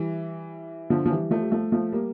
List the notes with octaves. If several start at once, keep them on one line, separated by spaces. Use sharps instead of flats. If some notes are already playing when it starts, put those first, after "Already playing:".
Already playing: E3 G3
D3 F3
F3
E3 G3
F3 A3
G3
F3 A3
F3 A3
G3 A#3